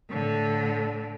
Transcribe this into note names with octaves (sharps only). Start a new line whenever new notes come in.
A2 D3